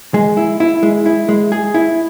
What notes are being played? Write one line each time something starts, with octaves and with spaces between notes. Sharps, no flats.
G#3
E4
E4
G#3
E4
G#3
G#4
E4